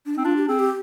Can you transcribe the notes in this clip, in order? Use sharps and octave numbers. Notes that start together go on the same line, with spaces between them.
D4
C4 D#4
D4 F4
G4
C4 G#4
G4